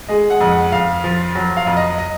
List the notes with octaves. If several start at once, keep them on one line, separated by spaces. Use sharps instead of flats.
G#3 D#5
F#5
F2
F#5
F2 F5
F3
F#3
F5
F2
D#5
D#5